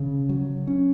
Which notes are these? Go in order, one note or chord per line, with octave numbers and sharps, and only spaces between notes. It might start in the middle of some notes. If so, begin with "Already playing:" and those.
Already playing: C#3
F#3
C#4